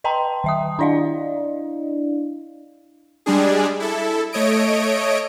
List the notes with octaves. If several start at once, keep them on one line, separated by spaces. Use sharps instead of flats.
B4 D#5 G5 A5 A#5 C6
D#3 E5 D#6
D4 E4 D5 D#5 F5
G3 G#3 D4 G#4
E4 A4
A3 C#5 D#5 D7